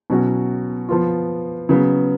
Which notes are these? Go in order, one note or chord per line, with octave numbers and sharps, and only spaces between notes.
B2 F#3 C#4 F#4
F3 B3 F4
C#3 F#3 B3